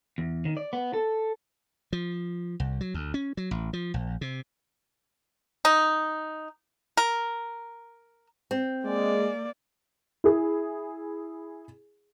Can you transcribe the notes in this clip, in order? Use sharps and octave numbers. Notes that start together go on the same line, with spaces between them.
E2
D#3
D5
B3
A4
F3
C2
F#3
D2
C#4
F#3
A1
F3
A#1
C3
D#4
A#4
C4
G#3 A#3 D5
E4 G#4